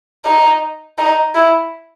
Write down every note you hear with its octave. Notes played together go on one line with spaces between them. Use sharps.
D#4
D#4
E4